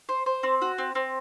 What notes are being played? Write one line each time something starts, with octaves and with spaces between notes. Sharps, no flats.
C5
C5
C4
F#4
C4
C4